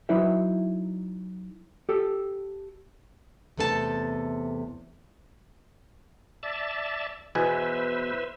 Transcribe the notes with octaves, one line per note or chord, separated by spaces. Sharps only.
F#3 D#4 E4 B4 C5 E5
G4 A4
E2 C3 A3 A4 B4 A5
D5 E5 A5
E2 B2 B4 C5 E5 G#5